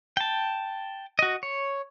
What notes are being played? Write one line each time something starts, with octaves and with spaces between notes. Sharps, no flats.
G5 A5
F#4 D#5
C#5